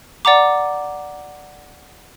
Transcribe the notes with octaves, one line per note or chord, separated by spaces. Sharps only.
D5 F#5 A#5 D6